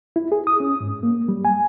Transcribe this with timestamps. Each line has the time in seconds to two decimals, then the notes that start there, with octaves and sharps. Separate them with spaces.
0.16 E4
0.32 G#4
0.47 D#6
0.60 C#4
0.80 G#2
1.03 A#3
1.28 G3
1.45 G#5